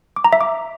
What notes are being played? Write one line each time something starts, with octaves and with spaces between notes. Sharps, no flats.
D6
A#5
E5
D6